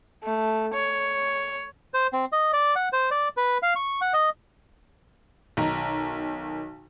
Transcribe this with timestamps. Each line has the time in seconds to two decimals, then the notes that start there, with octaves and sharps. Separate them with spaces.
0.24 A3
0.74 C#5
1.94 C5
2.13 C4
2.32 D#5
2.53 D5
2.76 F#5
2.93 C5
3.11 D5
3.37 B4
3.63 F5
3.76 C#6
4.01 F#5
4.13 D#5
5.57 B1 D#3 A#5